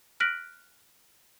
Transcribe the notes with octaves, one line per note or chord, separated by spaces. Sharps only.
F6 F#6 A#6 B6 D7 F#7